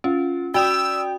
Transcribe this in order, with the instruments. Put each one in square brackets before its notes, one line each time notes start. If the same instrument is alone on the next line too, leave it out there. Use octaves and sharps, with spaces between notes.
[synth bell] C#4 [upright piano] F4
[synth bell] F#4 D5 D#6 [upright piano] G5 [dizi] E6